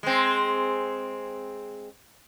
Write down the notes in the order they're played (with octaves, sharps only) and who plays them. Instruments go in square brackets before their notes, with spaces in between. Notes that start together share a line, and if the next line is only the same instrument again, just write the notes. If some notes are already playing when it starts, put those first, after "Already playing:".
[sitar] G#3 C4